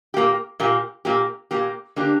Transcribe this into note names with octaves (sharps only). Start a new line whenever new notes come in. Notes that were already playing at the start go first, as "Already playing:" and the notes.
A#2 A#3 G4
A#2 A#3 G4
A#2 A#3 G4
A#2 A#3 G4
D3 A#3 D4 G4